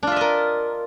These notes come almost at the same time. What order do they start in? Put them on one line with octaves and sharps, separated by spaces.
D4 F4 E5 D#5 A#4